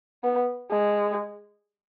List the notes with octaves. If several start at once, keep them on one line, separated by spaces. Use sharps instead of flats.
B3
G#3